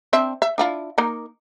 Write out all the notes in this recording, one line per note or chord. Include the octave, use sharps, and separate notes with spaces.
C4 D4 E5
E5
D4 E4 F4
A#3 D#4 A#4